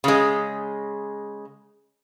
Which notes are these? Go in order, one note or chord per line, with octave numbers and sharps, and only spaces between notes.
C#3 G#3